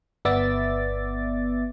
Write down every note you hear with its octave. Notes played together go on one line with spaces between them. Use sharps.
G1 B3 D5 E5 D6 A6